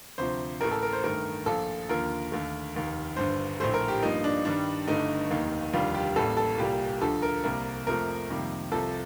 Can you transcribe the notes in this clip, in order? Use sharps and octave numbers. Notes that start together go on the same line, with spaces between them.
D2 C3 F3 C5
A1 A2 A3 A#4
A4
A#4
C5
G2 D#3 A3 A#4
A#1 A#2 F3 A4
D#2 D3 F3 A#3 A#4
D#2 D3 A3
F1 D#2 D#3
G1 G2 D3 C5
A#1 A2 A3 C5
A#4
G4
G2 F3 A#3 D#4
D4
G2 D#3 G3 D4
G1 G2 D3 A3 D#4
F1 D#2 D#3 A#3
F1 D#2 D3 G3 F4
G4
A1 A2 G3 A#3 A4
A4
C2 A#2 G3 A#3 G4
D2 D3 F3 A4
A#4
C2 C3 G3 A#3 A#4
F2 C3 F3 A3 A#4
F2 C3 D#3 G3 A#3
C2 C3 F3 A4